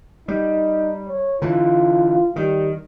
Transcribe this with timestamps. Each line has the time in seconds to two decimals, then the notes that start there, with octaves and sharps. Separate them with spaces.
0.28 G3 D#4
1.09 C#5
1.42 D3 E3 F4
2.36 D#3 G3